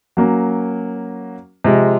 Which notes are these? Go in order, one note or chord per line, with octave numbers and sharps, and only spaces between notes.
F#3 A#3 C#4
C3 F3 G#3